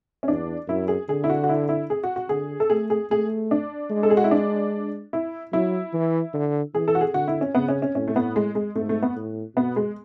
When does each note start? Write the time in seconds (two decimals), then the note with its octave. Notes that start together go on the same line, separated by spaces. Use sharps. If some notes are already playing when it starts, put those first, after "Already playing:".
0.23 C#4
0.28 E2 D4
0.68 F#2 E4
0.88 G#4
1.09 D3 G#4
1.24 E4
1.30 F#4
1.44 F#4
1.49 E4
1.69 E4
1.90 G#4
2.04 F#4
2.16 F#4
2.29 D3 G#4
2.60 A4
2.70 A3 G#4
2.90 G#4
3.11 A3 G#4
3.51 D4
3.91 G#3
4.03 A4
4.10 G#4
4.17 F#4
4.24 E4
4.31 D4
5.13 E4
5.52 F#3 E4
5.93 E3
6.34 D3
6.75 E3 G#4
6.88 A4
6.95 F#4
7.01 G#4
7.14 D3 F#4
7.28 E4
7.41 C#4
7.55 C#3 B3
7.68 C#4
7.82 C#4
7.95 A2 C#4
8.08 A3
8.16 B3
8.36 G#3
8.55 G#3
8.76 G#2 A3
8.89 A3
9.03 B3
9.16 A2
9.56 B2 B3
9.76 G#3